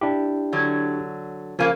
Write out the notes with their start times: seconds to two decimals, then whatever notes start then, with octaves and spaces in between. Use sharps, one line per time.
0.01 D4 E4 G4
0.53 D3 F#3
1.59 C#3 F3 A#3 G#5